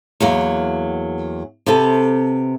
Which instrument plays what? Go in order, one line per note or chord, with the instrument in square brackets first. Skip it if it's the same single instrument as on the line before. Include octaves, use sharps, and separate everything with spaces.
[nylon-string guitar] E2 F#3 A#3
C3 B3 C4 A4